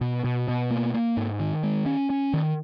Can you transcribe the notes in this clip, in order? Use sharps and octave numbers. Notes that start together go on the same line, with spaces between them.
B2
B2
B2
A#3
A#3
G#2
D#3
G#3
C#4
C#4
D#3